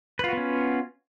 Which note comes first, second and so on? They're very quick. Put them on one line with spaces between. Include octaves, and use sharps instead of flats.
B4 F4 F#4 B3 C#4